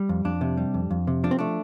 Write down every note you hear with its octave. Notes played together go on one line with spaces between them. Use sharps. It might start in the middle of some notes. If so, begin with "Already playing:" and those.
Already playing: G3
F2
F2 D4
C3
G3
F2
F2
C3
F3 D4
C4
A3 D4